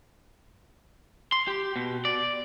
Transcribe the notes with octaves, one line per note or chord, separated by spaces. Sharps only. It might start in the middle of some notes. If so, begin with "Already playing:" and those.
C6
G4
B2
D5